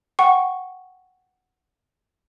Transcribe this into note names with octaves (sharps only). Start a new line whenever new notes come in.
F#5 G5 C#6